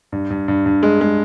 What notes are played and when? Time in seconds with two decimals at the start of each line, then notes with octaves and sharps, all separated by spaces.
0.12 G2
0.30 G2
0.48 G2
0.66 G2
0.83 G#3
1.01 G#3